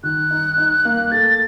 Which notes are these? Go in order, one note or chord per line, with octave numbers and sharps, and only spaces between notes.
D#3 F#6
D#4
D#4
A#3
A3 A6